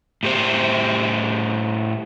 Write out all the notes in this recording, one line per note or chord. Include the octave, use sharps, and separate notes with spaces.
A2 G4 C5